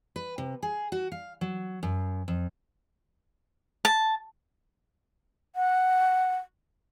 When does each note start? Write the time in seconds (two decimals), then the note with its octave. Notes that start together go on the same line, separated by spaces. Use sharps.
0.16 B4
0.38 C3
0.62 G#4
0.92 F#4
1.12 F5
1.41 F#3
1.83 F#2
2.28 F2
3.85 A5
5.56 F#5